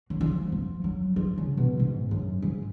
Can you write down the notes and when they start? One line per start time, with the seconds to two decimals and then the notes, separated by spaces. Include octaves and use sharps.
0.10 F#3
0.21 F3
0.52 F3
0.84 F#3
1.16 F3
1.38 C#3
1.57 B2
1.79 G#2
2.11 F#2
2.42 G#2